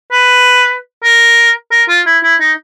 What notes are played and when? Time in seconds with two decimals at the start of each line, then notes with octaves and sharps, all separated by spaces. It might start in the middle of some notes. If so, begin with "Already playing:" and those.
0.12 B4
1.03 A#4
1.71 A#4
1.88 F4
2.06 E4
2.23 E4
2.40 D#4